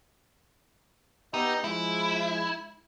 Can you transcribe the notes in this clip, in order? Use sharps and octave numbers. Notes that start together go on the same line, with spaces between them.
B3 D#4 G4 E5
F3 G#3 E4